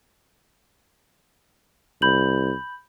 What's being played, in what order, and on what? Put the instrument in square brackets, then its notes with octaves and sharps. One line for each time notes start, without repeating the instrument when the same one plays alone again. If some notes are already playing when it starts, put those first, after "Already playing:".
[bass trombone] C2 [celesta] B5 G6 F#7